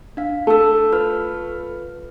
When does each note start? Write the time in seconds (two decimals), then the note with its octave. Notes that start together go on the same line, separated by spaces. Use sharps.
0.17 D4 F5
0.47 A3 A5 E6
0.92 F4 B4 F6